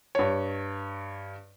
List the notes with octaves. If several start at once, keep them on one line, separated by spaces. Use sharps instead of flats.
G2 C#5